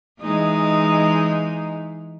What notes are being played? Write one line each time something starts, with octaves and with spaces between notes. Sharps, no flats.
E3 G#3 D#4